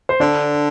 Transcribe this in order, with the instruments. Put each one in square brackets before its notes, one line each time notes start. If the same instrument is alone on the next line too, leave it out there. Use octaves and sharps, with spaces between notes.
[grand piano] C5
[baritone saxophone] D3 [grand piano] D4 D5